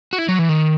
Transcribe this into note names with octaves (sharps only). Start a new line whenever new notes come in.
F#4
E4
F#3
E3
D#3